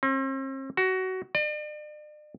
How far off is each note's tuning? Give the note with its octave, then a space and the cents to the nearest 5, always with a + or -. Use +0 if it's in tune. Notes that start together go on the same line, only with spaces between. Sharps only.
C4 +45
F#4 +20
D5 +40